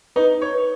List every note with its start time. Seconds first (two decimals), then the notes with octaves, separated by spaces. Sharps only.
0.16 D#4 B4
0.42 C#5
0.54 B4